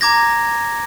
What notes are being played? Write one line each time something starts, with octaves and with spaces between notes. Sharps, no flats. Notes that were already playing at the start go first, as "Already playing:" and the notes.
A#5 D6 G#6 A#6